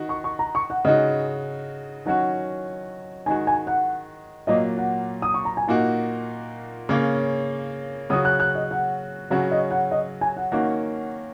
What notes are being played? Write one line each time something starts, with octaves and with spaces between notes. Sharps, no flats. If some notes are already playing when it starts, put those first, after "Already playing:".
Already playing: D#3 D#4 F#4
C#6
C#6
A#5
C#6
F#5
C#3 G#3 D#4 F#4 D#5
D#3 F#3 C#4 F#4 F#5
D#3 G#3 F#4 G#5
G#5
F#5
A#2 F#3 A#3 D#5
F#5
D#6
C#6
A#5
G#5
A#2 A#3 D#4 F#4 F#5
C#3 A#3 C#4
C#3 F#3 C#4 F#4 D#6
F#6
F#6
D#5
F#5
C#3 F#3 C#4 F#4 F#5
D#5
F#5
D#5
G#5
F#5
D#3 A#3 C#4 F#4 F#5